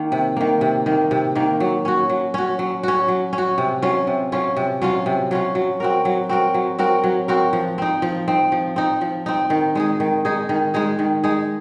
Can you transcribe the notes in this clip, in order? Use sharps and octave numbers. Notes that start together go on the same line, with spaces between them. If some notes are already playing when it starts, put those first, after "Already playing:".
Already playing: D#3 A#3
C3
D#3 A#3
C3
D#3 A#3
C3
D#3 A#3
F#3
C#4 F#4
F#3
C#4 F#4
F#3
C#4 F#4
F#3
C#4
F#4
C3
F#3 C#4 F4
C3
F#3 C#4 F4
C3
F#3 C#4 F4
C3
F#3 C#4 F4
F#3
C4 F#4 A#4
F#3
C4 F#4 A#4
F#3
C4 F#4 A#4
F#3
C4 F#4 A#4
F3
C4 D#4
F3
C4 D#4
F3
C4 D#4
F3
C4 D#4
D#3
G#3 D#4 G#4
D#3
G#3 D#4 G#4
D#3
G#3 D#4 G#4
D#3
G#3 D#4 G#4